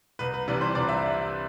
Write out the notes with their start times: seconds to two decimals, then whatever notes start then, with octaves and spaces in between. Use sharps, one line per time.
0.19 C2 B4
0.34 B4
0.48 C3 E3 G3 D4 B4
0.61 C5
0.75 C2 D5
0.89 E5